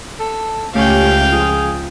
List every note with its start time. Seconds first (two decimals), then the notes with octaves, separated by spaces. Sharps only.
0.19 A4
0.75 C#2 A3 C#4 G4 F5 G5
1.32 F3 F4 G#4